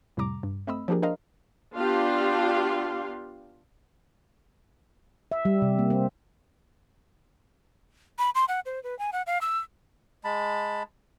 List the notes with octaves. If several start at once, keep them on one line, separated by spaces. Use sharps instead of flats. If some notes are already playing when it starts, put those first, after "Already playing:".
F2 A2 C3 G3 A#5 D6
G2
A3 C4 D#5 B5 E6
F3 A#3 D4 G4 G#4 A#4
D4 A#4 C5 D#5 F5 A#5
B3 D4 F4 G4 F5 C6
E5
G3
C3
A#3
C4
B5
C6
F#5
C5
B4
G#5
F#5
F5
E6
G#3 A5 B5